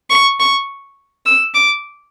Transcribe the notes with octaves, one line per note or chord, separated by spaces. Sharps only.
C#6
C#6
E6
D6